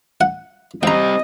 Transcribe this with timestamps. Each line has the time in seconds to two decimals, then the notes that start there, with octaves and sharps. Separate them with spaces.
0.21 F#5
0.83 G3 C4 D#5 G5 A#5